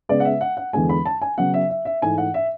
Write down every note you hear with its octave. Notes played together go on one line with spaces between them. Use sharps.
C#3 G#3 B3 D5
F#5
E5
F#5
F#5
E2 D3 G#3 B3 G#5
B5
A5
G#5
C#3 F#3 B3 F#5
E5
E5
E5
G#2 E3 A3 G#5
F#5
E5